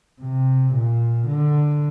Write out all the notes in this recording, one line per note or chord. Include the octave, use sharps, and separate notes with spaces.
C3
A#2
D3